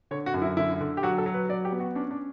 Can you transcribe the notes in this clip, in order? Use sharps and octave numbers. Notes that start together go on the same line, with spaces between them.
D3 C#5
F#4
F#2
E4
D3 E4
D3
G4
F#3 F#4
A4
F#3
B4
F#3 D5
G4
B3
F#4
C#4 D4
D4